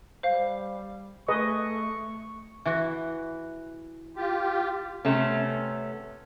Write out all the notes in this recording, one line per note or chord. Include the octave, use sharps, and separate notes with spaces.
G3 C5 F5
A3 G#4 B4 D#5 C#6
E3 F#4
F4 G4
C3 A3 B3 C#4